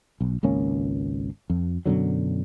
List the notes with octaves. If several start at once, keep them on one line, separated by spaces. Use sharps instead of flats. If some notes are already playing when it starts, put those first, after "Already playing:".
B1
G#1 C#2 A#3 C#4
F2
F#2 B2 D3 F#3